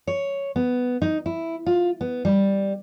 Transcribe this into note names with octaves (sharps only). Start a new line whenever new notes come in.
C#5
B3
D#4
E4
F4
B3
G3